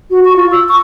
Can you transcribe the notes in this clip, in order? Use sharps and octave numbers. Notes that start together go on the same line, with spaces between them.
F#4
C#6
F4
E6
C#6